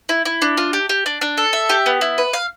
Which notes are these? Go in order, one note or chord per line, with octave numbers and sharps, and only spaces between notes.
E4
E4
D4
F4
G4
G4
D4
D4
A4
E5
G4
B3
E4
B4
F5